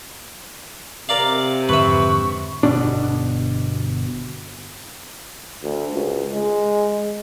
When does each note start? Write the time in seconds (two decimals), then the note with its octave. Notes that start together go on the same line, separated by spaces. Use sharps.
1.09 C3 A#4 D5 F5
1.69 F2 G#2 D3 B4 E5 C#6
2.63 G1 B2 D4
5.63 D2
5.94 C#2
6.33 G#3